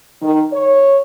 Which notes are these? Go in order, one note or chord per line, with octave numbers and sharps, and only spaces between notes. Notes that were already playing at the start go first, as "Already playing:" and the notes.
D#3
C#5